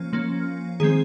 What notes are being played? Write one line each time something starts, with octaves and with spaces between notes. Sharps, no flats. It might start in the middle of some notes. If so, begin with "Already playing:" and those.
Already playing: F3 A#3 C#4
F3 A#3 C#4
D#3 G#3 C4 G#4